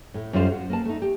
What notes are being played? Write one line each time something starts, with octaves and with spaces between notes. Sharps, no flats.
A2
F#2 G3 F4 A4 C5 F5
F#4
A#3 B4 A5
A3 D#4
G4